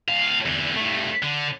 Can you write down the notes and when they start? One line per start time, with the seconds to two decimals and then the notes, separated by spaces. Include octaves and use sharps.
0.08 A2 F5
0.46 E2 D3
0.77 G2 A3
1.23 D3